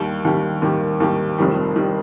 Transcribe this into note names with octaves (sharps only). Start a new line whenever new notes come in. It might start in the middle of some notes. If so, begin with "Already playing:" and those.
Already playing: D#2 D#3 G3
D#2 D#3 G3
D#2 D#3 G3
D#2 D#3 G3
F1 F2 D#3 G3
D#3 G3